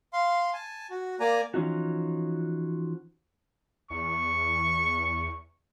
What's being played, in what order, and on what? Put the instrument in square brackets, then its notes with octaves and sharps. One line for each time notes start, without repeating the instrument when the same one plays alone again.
[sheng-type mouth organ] F5 C6
G#5 A5
F#4
A#3 D5 G#5 A#5
[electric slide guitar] E3 F3 C#4 D#4 F#4
[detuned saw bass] E2 [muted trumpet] C#6